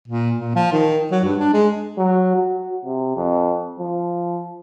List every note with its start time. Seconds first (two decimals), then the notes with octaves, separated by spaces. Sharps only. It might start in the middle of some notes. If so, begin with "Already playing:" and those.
0.08 A#2
0.38 A#2
0.55 F3
0.72 D#3
1.11 F#3
1.24 G2
1.39 D4
1.53 G#3
1.98 F#3
2.36 F#4
2.85 C3
3.17 F2
3.79 F3